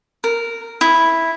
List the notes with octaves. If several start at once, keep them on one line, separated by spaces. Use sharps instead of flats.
A#4
E4